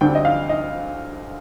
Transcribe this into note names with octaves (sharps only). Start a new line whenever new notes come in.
D2 D3 G3 C4 G5
D#5
F5
D#5